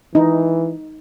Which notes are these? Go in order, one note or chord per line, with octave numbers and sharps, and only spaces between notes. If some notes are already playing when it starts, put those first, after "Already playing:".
E3 D#4